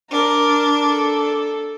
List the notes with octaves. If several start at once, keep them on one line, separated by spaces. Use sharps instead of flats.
D4 A#4
A4